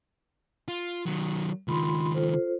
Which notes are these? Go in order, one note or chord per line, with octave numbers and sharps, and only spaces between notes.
F4
D#3 F#3
C#2 D#3 F4 B5 C6
F4 A4 C5